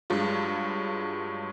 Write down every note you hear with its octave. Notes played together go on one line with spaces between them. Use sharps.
G2 F#3 G#3 F4